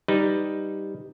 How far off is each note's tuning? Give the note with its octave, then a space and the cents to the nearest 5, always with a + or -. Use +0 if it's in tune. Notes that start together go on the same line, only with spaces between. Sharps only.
G3 +0 D#4 +0 B4 +0